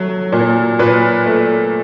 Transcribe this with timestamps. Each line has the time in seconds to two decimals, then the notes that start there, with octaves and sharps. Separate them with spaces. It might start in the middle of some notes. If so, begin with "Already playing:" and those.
Already playing: F#3 A3
0.32 A#2
0.79 A#2 B4
1.26 A3